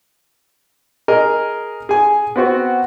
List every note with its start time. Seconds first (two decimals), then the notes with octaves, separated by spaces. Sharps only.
1.08 G#4 A#4 D#5
1.89 G#4 G#5
2.36 B3 C4 F#4